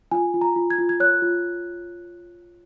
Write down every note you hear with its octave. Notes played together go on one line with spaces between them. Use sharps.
F4 G#5
F4
A#5
F4
G#6
F4
G#6
C#5 F#6
F4